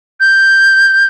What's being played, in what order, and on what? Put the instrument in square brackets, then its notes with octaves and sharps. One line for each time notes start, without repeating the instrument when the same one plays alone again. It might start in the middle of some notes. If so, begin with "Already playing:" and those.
[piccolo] G6